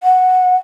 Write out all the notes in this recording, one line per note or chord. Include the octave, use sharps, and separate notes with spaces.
F#5